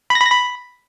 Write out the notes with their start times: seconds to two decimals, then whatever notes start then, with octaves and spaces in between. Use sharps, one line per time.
0.10 B5
0.15 A#6
0.20 B5
0.25 A#6
0.30 B5